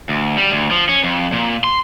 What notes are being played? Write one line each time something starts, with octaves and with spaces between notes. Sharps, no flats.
D2
G3
D2
F3
C#4
F2
A#2
C6